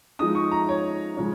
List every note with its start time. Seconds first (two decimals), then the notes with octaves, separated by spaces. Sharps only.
0.19 F3 G#3 D#4 D#6
0.35 C#6
0.51 A#5
0.69 C#5
1.17 C#3 F3 G#3 C#4